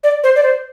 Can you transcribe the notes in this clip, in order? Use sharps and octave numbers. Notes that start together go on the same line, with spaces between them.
D5
C5
D5
C5